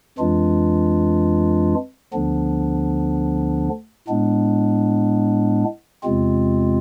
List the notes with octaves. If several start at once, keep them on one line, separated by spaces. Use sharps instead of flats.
F2 E3 G#3 D4 F4
D2 D3 F3 B3 D4
A2 G#3 B3 D4
E2 C3 G#3 C4 F4